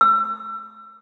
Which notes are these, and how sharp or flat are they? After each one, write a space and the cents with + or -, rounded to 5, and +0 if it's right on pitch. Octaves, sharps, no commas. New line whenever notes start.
E6 +35